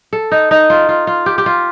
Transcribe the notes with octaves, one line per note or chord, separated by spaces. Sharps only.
A4
D#4
D#4
F4
F4
F4
G4
G4
F4